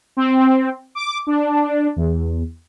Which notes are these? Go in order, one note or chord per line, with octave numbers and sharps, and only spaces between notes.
C4
D6
D4
E2